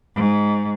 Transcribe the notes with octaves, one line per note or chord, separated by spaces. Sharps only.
G#2